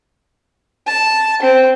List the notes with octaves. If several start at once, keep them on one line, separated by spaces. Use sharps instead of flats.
A5
C4